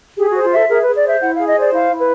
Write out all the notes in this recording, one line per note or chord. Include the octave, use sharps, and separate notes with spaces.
G4 G#4
F#4 C5
F4
A4 E5
G#4 A#4
B4
G#4
D5
C5 E5
E4 F#5
G#4 F5
D#5
C5 D5
E4 F5
E4
B4